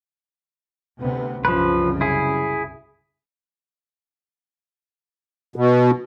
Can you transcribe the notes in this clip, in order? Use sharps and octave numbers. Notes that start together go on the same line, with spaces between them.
D2 C3 B3
C2 F#2 C#3 F3 B4
E4 G#4
B2